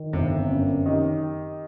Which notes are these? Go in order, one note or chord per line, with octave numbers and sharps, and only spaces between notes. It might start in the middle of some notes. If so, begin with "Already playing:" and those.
Already playing: D#3
G1 C3
F#2
D#3 G4